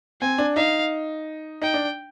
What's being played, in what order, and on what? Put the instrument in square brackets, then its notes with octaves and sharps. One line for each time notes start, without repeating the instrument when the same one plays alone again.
[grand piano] C4 [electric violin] G#5
[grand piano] D4
[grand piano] D#4 [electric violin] F5
[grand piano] D#4 [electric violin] G5
[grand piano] D4